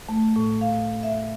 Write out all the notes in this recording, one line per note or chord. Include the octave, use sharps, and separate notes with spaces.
A3
A2
F5
E5